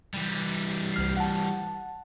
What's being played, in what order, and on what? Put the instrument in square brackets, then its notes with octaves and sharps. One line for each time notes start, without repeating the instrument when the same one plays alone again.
[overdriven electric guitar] E3 G3
[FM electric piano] C2 F6 C7
F#5 A5